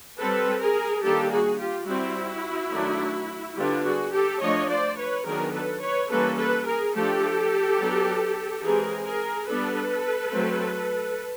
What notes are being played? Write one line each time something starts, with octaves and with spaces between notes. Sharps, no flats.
G3 C4 A4 B4
G#4 A#4
D#3 G3 A#3 D4 G4 A4
F#4 G#4
F4 G4
G3 C4 E4 F#4
D#3 F#3 A3 D4
D3 G3 B3 D4 F4 G4
F#4 G#4
G4 A4
F3 A3 D4 C#5 D#5
C5 D5
B4 C#5
D#3 F#3 B3 D4 G#4 A#4
A4 B4
B4 C#5
E3 G3 A#3 C#4 A4 B4
A4 B4
G#4 A#4
F3 A3 D4 G4 A4
F#3 B3 D4
E3 G#3 C4 G#4 A#4
G#4 A#4
G3 B3 D4 A4 B4
F#3 A3 C4